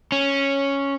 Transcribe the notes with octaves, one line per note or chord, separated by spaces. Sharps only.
C#4